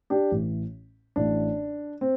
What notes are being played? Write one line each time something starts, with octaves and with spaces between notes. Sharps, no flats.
D4 G4
A1 A2 E3
A1 A2 E3 D4
C4